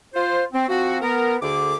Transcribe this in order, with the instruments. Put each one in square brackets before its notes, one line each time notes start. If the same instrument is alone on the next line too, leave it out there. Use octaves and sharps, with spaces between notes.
[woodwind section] F4 C5
C4
F3 C4 F#4
B3 A#4
D2 D3 G#4 D6